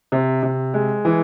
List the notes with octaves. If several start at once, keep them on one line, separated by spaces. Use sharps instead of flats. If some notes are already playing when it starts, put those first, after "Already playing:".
C3
C3
G#3
E3